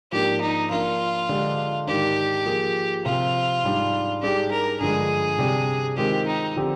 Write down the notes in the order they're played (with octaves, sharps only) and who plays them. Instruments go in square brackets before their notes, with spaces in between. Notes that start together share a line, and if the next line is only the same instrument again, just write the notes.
[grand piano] G#2 F3 A#3 D4 [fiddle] G4
[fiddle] D#4
[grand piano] F3 A#3 D4 [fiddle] F4
[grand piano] D3 G#3 D4 G4
[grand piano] G#2 D#3 G#3 D4 [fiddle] G4
[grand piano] F3 A#3 F4 G#4
[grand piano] C3 F3 C4 [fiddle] F4
[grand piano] G#2 G3 D4
[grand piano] G#2 G3 D4 G#4 [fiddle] G4
[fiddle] A#4
[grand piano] G2 D3 F3 G#3 [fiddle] G#4
[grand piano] C3 G3 D4 G4
[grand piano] D#3 G#3 C4 F4 [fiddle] G4
[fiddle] D#4
[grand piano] D3 F3 C4 G4